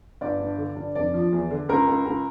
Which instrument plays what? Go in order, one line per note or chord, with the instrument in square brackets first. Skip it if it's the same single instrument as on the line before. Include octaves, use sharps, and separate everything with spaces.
[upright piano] G1 D5
G2
D3
G2
F1 D5
F3
E2
D3
C#2 A#4
C#2
C#2